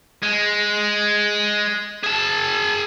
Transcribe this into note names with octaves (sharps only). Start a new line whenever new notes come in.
G#3
G#4 A5